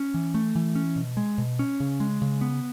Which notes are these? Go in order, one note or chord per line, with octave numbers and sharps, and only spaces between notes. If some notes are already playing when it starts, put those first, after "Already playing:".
Already playing: C#4
E3
A3
E3
C#4
B2
G#3
B2
C#4
C#3
G#3
C#3
B3